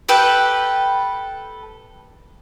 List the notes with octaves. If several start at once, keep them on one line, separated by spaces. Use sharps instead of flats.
G4 A4 B4 G5